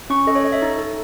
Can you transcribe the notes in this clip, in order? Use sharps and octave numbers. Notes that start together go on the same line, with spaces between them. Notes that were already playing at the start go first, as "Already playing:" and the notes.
C#4 C#6
A4 D#5
C#5
A4 D#5
E5
D#4
A4